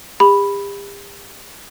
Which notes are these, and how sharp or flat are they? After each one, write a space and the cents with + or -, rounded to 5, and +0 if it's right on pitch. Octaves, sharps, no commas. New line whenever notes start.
G4 +40 B5 +0